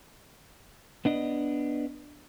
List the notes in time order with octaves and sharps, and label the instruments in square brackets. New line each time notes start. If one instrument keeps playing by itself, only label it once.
[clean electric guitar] B3 D4 D#5